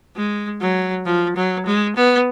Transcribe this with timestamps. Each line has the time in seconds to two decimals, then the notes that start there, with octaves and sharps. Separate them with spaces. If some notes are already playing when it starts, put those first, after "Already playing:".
0.16 G#3
0.61 F#3
1.06 F3
1.36 F#3
1.66 G#3
1.96 B3